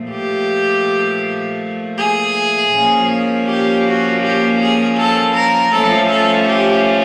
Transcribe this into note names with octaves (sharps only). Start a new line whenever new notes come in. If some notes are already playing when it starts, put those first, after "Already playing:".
Already playing: A#2 F3 A3
G4
G#4
A#2 F3 A#3 C#4
G4
F#4
G4
G#4
A4
A#4
F3 A3 C#4 A4
A4
G4